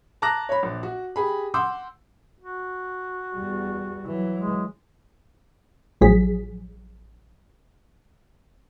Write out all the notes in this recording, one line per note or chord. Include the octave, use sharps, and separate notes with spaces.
A5 A#5 D6 F#6 A#6
C#5 B5
A#1
F#4
G4 G#4 B5
F#5 C6 D6 E6 G6
F#4
E2 G3
E3 F#3
G#3
A1 F3 F#3 G#4 B6